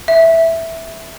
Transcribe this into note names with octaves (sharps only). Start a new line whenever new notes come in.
E5